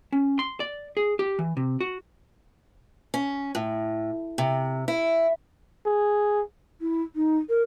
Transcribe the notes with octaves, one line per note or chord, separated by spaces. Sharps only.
C#4
C6
D5
G#4
G4
E3
C3
F#4
C#4
A2
C3
E4
G#4
E4
D#4
A#4